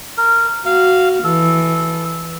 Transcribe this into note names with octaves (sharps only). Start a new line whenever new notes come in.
A#4
F#4 F5
E3 A4